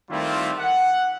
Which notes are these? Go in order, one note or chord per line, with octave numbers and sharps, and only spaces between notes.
D#3 G3 A3 C4 E4 F4
F#5